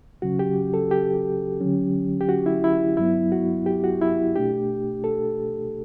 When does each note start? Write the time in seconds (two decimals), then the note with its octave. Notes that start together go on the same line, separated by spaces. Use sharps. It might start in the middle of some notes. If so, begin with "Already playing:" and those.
0.22 C#3 F#3 C#4 F#4
0.39 G4
0.74 A4
0.91 G4
1.60 D3 F#3 C#4
2.21 G4
2.29 F#4
2.46 E4
2.64 E4
2.97 G2 F#3 B3 E4
3.32 F#4
3.66 G4
3.84 F#4
4.01 E4
4.36 B2 A3 D4 G4
5.04 A4